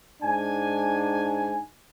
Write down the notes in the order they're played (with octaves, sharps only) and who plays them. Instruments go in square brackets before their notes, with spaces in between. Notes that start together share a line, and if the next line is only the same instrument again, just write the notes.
[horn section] G#2 D4 G#5